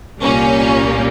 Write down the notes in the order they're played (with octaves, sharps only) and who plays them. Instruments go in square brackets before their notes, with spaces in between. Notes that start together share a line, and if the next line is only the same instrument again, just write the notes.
[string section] C2 A#2 G3 A#3 C#4